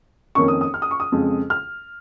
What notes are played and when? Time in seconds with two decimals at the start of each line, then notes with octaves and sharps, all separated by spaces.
0.35 F2 D#3 A#3 C#4 C#6
0.48 D#6
0.61 D#6
0.74 F6
0.82 D#6
0.91 C#6
1.00 D#6
1.12 F2 C#3 G#3
1.50 F6